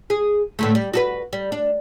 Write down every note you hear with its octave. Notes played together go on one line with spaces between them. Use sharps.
G#4
A2 D3 A3
G3
F#4 A4 B4
G3
D4